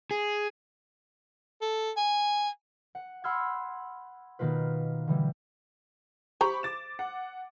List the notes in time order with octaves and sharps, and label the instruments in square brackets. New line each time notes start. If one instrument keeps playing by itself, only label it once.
[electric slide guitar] G#4
[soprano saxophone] A4
G#5
[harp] F#5
F#5 B5 C6 E6 F6 G#6
B2 D#3 A#3 F4 B4
D3 E3 G3
[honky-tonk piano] G4 B5 C#6 [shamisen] C5 A#5
[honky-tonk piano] D6 A6 E7
F#5